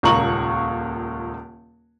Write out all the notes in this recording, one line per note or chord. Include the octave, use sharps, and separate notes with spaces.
D#1 C#2 A#2 A#5 C#6 F#7